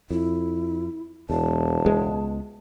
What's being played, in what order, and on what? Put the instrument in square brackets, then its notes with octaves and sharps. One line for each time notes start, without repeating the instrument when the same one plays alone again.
[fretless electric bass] F2 [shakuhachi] E4
[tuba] E1 [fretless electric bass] E2 [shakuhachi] A5
[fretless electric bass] C#2 G#3 B3